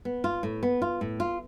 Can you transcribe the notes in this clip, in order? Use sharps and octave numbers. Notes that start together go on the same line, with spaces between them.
B3
F4
A2
B3
F4
A2
F4